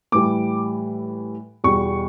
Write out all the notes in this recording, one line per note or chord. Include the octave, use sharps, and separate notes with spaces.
A2 E3 G3 D6
E2 B2 G3 C#6